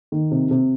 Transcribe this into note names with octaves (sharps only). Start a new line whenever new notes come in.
D#3
C3
C3